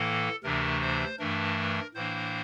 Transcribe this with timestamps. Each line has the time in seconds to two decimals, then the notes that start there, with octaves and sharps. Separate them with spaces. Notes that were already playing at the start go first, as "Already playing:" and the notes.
Already playing: A2 E3 A#3 A4
0.44 D2 C3 E3 A3 D4 A#4
0.82 C5
1.19 G2 E3 A3 D4 A#4
1.95 A2 E3 A#3 D4 C5